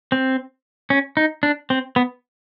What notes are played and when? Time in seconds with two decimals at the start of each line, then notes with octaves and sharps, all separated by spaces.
0.12 C4
0.90 C#4
1.17 D#4
1.43 D4
1.70 C4
1.96 B3